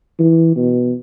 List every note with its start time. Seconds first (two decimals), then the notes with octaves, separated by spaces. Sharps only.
0.19 E3
0.56 B2